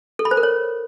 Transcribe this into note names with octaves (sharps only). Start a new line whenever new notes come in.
A4
B5
C5
A#4
C#5